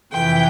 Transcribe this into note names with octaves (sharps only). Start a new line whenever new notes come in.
F2 C3 E3 G5